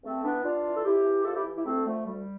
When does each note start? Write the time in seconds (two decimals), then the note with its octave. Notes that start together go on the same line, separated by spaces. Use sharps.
0.03 G2 A3 C4
0.24 E3 B3 D4
0.44 G2 D4 F4
0.65 E3
0.75 A4
0.84 F2 E4 G4
1.04 E3
1.25 F2 F4 A4
1.35 E4 G4
1.45 E3
1.55 E4 G4
1.65 D2 A3 C4
1.86 D3 F3 A3
2.06 D2 G3